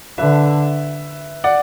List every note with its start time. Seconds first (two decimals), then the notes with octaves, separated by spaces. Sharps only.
0.18 D3 B4 E5
1.44 D5 F#5